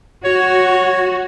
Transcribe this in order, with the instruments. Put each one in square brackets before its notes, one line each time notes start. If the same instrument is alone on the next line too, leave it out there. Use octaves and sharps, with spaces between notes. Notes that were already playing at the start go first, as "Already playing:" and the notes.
[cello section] F#4 [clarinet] C#5